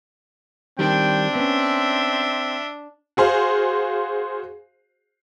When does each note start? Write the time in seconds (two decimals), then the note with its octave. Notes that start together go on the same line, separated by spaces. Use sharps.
0.79 D#3 G3 C4 D4 G5
1.35 B3 C#4 E5
3.17 F#4 G#4 C5 F5